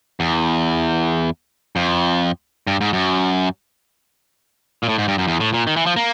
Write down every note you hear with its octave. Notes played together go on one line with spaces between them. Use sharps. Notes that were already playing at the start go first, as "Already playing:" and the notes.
E2
F2
G2
G#2
F#2
A#2
A2
G#2
G2
F#2
E2
A2
A#2
D#3
E3
F3
A#3